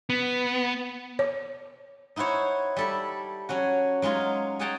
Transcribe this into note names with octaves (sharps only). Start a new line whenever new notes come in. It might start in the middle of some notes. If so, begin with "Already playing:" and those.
B3
C#5
D#4 E4 F#4 C5 C#5
G3 A4 E5
F#3 C#4 F#4
F#3 G#3 D#4 F4
C#4 G#4 F#5 G5 A5 A#5